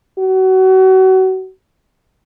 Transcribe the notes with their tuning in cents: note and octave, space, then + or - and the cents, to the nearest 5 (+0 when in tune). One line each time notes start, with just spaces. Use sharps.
F#4 +30